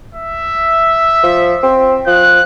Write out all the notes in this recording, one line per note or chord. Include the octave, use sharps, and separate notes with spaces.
E5
F3
C4
F3 F#6